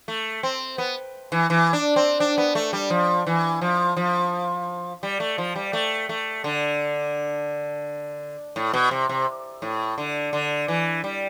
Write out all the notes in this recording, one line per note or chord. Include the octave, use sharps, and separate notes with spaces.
A3
C4
B3
E3
E3
D4
C4
D4
B3
A3
G3
F3
E3
F3
F3
G3
A3
F3
G3
A3
A3
D3
A2
B2
C3
C3
A2
D3
D3
E3
G3